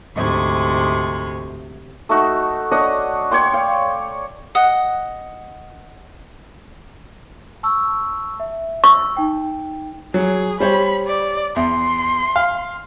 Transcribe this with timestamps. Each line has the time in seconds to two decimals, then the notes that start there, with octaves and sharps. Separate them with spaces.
0.15 D2 G#2 C3 C#6 G#6
2.09 A3 D#4 F#4
2.72 D4 C#5 D#5 F#5
3.31 C#5 D5 G5 C6
3.53 F5 G5
4.55 D#5 F#5
7.63 A5 C#6 E6
8.40 E5
8.84 C#6 E6
9.17 D#4 G5
10.14 F#3 G#4
10.60 G3 C5 C#5 B5
11.07 D5
11.56 E2 C6
12.36 F5